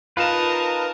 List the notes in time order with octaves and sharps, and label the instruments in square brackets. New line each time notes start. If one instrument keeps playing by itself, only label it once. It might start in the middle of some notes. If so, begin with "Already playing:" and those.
[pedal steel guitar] D#4 B4 [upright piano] F4 E7 [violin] A#4 A5